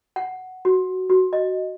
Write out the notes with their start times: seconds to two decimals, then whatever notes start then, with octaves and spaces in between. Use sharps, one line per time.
0.16 F#5
0.65 F#4
1.10 F#4
1.33 D#5